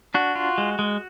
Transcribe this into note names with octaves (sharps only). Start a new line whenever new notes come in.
D4 F#4
F4
G#3
G#3